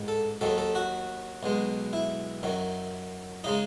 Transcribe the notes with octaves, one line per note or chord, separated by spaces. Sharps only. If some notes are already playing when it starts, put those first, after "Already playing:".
Already playing: A1 G#2 D#3
A4
D#2 D#3 F#3 A4
A4
F#4
B1 B2 G#3
E4
F#2 D#3 F#3
C#3 G#3 D#4